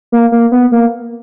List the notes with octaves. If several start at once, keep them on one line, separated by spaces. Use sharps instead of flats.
A#3
A#3
B3
A#3